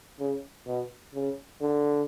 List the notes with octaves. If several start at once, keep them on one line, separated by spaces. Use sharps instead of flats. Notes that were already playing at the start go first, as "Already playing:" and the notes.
C#3
B2
C#3
D3